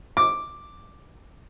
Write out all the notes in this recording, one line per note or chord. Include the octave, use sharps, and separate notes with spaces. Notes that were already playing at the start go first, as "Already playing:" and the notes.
D6